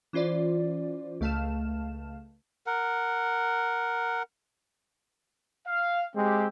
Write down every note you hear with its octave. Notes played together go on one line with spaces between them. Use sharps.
E3 C#4 F4 C5 D5
C#2 A3 F5 A5 F6 E7
A#4 F#5
F5
G#3 C4 G4